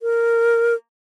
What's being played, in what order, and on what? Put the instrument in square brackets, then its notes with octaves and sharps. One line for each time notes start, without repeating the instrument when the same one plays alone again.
[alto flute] A#4